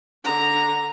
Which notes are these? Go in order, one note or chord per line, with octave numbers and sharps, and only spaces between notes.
D3 A#5